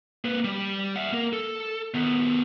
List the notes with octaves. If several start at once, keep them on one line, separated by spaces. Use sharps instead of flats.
A#3 B4
G3 D5
E5 F#5
A#3 A#4
A4
D#3 B3